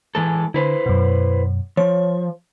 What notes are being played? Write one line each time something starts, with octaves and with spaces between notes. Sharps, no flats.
E3 G#3 A4
D3 E4 B4 C5
F#2 B2
F3 C#5